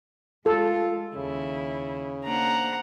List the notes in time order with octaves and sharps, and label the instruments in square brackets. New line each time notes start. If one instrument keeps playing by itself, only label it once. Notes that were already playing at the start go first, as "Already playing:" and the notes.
[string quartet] G#3 [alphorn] F4 [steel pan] A4
[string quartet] D#2 E4 [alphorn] C#3
[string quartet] A#3 D4 C5 [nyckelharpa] F#5 A#5